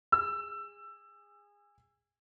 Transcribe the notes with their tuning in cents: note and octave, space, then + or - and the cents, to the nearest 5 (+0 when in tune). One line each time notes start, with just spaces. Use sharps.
G#4 -25 E6 +15